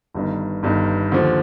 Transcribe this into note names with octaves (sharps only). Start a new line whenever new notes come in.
G1 G2 D#3
G1 G2 D#3
D#2 D3 F3